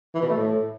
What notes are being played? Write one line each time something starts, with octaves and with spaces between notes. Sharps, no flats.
E3
B2
A3
A2